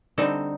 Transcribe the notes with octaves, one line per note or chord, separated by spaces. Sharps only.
D3 G3 C4 D#4 A4